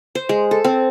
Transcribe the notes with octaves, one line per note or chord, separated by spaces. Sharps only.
C5
G#3
A4
C4